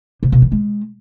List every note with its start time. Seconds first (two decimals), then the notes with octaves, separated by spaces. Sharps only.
0.23 C3
0.32 B2
0.42 E3
0.52 G#3